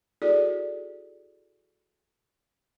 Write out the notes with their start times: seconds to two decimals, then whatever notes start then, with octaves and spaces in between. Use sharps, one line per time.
0.22 E4 F#4 G#4 A4 D5